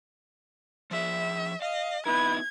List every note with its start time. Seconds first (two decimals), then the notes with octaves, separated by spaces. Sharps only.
0.91 F3 G#4 E5
1.62 D#5 F5
2.06 B3 D#4 E4 B4 G#6